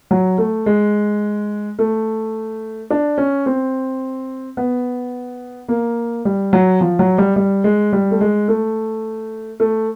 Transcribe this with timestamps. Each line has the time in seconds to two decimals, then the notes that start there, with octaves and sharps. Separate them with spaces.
0.11 F#3
0.38 A3
0.66 G#3
1.79 A3
2.90 D4
3.18 C#4
3.46 C4
4.57 B3
5.69 A#3
6.25 G3
6.53 F#3
6.81 F3
6.99 F#3
7.18 G3
7.36 G3
7.64 G#3
7.93 G3
8.11 A3
8.21 G#3
8.48 A3
9.60 A3